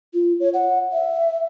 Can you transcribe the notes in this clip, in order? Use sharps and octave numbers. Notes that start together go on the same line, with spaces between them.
F4
C#5
F#5
E5